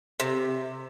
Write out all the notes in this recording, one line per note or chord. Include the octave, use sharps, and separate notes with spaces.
C3